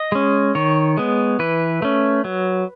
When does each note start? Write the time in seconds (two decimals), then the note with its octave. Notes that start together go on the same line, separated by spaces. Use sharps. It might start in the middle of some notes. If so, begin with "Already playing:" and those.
Already playing: D#5
0.12 G#3 C#4
0.55 D#3 C#5
0.97 G#3 B3
1.39 E3 B4
1.82 A3 C#4
2.24 F#3